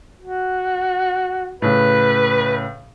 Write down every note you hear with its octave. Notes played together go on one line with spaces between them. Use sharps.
F#4
A2 C#3 B4